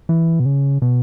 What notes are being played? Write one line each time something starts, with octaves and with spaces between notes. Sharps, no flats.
E3
B2
C#3
B2